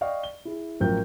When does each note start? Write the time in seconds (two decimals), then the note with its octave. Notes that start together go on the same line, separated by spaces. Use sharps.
0.01 D5 D#5 F5 G5 C#6
0.23 G7
0.45 E4 G#4
0.80 A1 F3 F#3 A#4 G5 G6